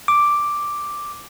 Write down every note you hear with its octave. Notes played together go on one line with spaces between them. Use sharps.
D6